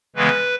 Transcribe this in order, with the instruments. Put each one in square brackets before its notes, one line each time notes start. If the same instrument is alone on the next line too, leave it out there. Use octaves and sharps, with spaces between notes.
[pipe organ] C#3 E3 G#3 B3 B4